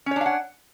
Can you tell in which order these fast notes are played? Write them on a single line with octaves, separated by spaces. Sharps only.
C#4 C#5 D4 F5 F#5